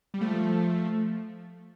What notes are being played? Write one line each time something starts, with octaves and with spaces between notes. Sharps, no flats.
G3
F3 A3